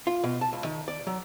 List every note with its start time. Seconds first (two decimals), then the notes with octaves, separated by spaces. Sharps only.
0.07 F4
0.24 B2
0.41 A5
0.53 C#2
0.65 D#3
0.88 D5
1.07 F#3